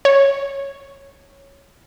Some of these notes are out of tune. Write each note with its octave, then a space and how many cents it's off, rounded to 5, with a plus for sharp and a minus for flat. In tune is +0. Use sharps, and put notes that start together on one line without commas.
C#5 -5